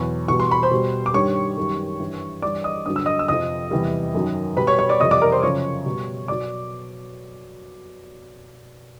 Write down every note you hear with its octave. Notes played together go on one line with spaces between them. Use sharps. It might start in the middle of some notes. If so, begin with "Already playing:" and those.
Already playing: E2 B2 F#3 C#6
E2 B2 G3 C#6
C6
B5
C5 C6
B2 G3
D6
G2 D#3 G3 C#5 C#6
F#2 D#3 G3
G2 E3 G3
G2 E3 G3 D5 D6
D#5 D#6
G2 D3 F#3 D#6
E6
D#5 D#6
E6
F2 C3 F3 D#5 D#6
E2 C3 E3 G3
F#2 D#3 F#3
B2 G3 B4 B5
C#5 C#6
C#5 C#6
D5 D6
F2 C3 E3 G3 D#5 D#6
D5 D6
A#4 A#5
C5 C6
F#2 C#3 F3 C#5 C#6
B2 G3
B2 F#3 D5 D6